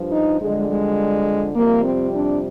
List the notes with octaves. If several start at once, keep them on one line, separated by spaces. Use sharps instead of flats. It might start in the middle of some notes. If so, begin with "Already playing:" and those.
Already playing: G2 F3
D#4
F2 D3 G3 G#3
G#3
F2 C3 G3 A#3
C4
D4